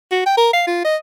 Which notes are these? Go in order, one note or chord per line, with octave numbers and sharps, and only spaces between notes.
F#4
G5
A#4
F5
F4
D#5